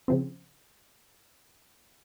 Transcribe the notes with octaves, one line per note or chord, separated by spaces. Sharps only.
C#3 F3 C4